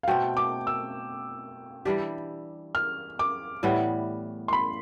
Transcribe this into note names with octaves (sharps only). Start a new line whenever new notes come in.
F5
B2 A3 C4 G5
D6
E6
E3 G3 D4 G4
F6
D6
A2 E3 G3 B3
C6
B5